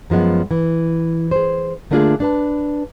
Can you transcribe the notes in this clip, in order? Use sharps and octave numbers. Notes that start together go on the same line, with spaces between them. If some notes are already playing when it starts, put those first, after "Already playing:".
F#2 F3 G#3 B3
E3
G#4 C5
D3 A3 A#3 D4 F4 G#4
D4 B4 A5